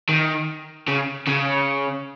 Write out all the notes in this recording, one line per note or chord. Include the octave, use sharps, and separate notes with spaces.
D#3
C#3
C#3